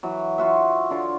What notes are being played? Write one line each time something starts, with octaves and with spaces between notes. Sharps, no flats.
E3 F#3
F4 F#4 E5
D3 F4 C#5